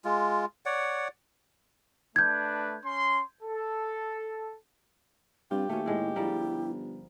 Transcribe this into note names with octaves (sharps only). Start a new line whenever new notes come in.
G#3 F4
C#5 D5 F#5
A3 D4 B4 G6 G#6
C#4 C6
A4
G2 C4 F4 G4
D#2 A3 C#4 F#4
A2 G#3 B3 E4
G1 F3 G3 E4 A#4